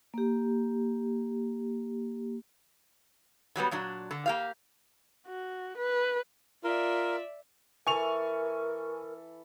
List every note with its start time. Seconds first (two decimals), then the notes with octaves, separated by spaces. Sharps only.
0.14 A#3 G4
3.56 D3 F#3 G3 B3
3.71 A#2 F#3 D4
4.11 D3
4.26 A#3 G4 F5
5.27 F#4
5.77 B4
6.64 F4 A#4 D5 E5
7.87 E3 A4 A#4 G#5 C#6 F7